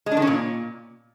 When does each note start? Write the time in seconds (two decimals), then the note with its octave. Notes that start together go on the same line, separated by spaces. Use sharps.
0.06 G#3
0.12 D4
0.17 D#3
0.22 C#4
0.27 A#2